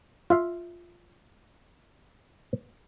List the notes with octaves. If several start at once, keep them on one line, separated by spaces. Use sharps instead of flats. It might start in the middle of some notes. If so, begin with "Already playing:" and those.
F4 E5 F5